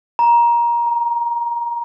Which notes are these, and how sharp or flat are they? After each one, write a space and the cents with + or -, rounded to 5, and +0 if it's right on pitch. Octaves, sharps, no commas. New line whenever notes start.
A#5 +20
A#5 -15